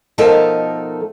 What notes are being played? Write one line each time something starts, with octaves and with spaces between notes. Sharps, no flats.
B2 F3 A3 D#4 A4 A#4